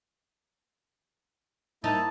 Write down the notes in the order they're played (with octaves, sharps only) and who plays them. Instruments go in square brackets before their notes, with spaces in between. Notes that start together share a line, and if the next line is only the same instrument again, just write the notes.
[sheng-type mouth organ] A#3 E4 [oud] D#4 [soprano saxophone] A5